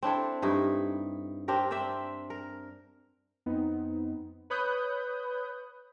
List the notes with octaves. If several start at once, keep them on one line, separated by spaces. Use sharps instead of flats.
C4 D4 E4 A4
G2 D#4 E4
C4 D4 G4 A#4
C4 C5 D5 E5
A#4
F2 B3 C4 D#4
B4 C#5 B5 D#6 F#6 G6